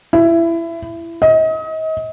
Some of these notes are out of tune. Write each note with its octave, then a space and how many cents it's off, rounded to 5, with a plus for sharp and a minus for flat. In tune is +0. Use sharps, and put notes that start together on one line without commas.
E4 +20
D#5 +35